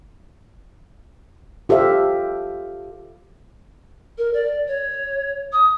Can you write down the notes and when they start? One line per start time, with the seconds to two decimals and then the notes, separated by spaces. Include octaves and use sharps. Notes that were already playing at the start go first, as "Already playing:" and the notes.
1.69 F4 G4 A4 C5 E5 F5
4.18 A#4
4.33 D5
4.67 C#5
5.52 D#6